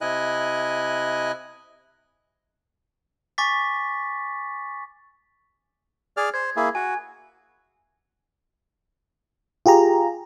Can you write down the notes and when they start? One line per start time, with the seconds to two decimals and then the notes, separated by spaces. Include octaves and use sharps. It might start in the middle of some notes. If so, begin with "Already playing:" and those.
0.01 C3 E4 D#5 G#5 F#6
3.38 G#5 C#6 D6 A6 B6
6.17 G#4 D5 F6
6.34 C5 G#6
6.56 A#3 E4 G#4
6.75 F#4 G#5
9.66 F4 G4 G#4 A#5